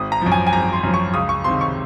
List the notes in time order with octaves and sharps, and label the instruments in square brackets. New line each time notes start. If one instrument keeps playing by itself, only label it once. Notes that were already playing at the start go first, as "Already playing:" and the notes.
Already playing: [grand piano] G#1 D#6
A#5
F#2 F3
G#5
G#5
G#1 A#5
C6
F#2 F3
C#6
C#2 D#6
C#6
C3 D#3 C6
C#6